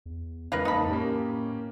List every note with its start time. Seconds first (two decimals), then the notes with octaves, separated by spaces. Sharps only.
0.06 E2
0.52 C#3 E3 G#3 A#4 B4 F5
0.65 F2 A#3 D#4 A5 B5
0.90 A2 A#3 C#4 G4